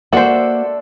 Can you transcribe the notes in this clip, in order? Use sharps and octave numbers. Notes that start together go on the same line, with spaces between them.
A#3 D4 F#4 A4 C5 E5